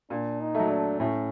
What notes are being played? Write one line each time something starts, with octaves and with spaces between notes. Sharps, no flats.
A#2 D4
D#4
F#3 A3
D4
A2 C#4